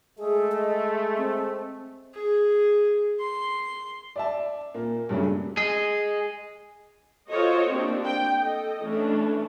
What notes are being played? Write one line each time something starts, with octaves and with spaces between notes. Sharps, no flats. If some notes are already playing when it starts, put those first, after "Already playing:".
G#3 A3 G#4
D#5
C4
G#4
C6
D5 E5 A5
A#2 A#3
G2 C#3 F#3 A3 C#4 D4
G#4 D#5
F4 F#4 A4 C5 C#5 D#5
A#3 C4 D4 G4
G5
A4 D#5
E3 A3 C#4 D4